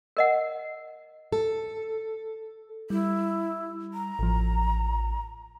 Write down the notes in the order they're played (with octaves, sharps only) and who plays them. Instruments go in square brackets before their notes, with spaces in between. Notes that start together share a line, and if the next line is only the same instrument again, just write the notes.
[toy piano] A#4 D#5 F#5
[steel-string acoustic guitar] A4
[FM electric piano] G3 [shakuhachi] E4
[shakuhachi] A#5
[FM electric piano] A1 F3